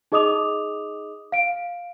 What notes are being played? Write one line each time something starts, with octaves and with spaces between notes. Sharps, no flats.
D#4 G#4 D#5 D6 D#6 F7
F5 D7